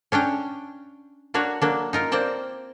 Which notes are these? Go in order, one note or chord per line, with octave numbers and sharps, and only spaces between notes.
C#4 D4 F5 G5
A#3 D4 F#4 C#5 F5
F#3 A#3 D4
D#4 F4 A#4
A#3 C4 C5 D5 G5 A5